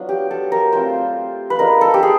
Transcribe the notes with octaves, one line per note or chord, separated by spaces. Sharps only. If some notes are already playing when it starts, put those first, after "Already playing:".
Already playing: F#3 B3 D4 F4
G4
A4
A#4
A3 C4 F4 C5
B4
G#3 B3 D4 F4 A#4
A4
G4
G#4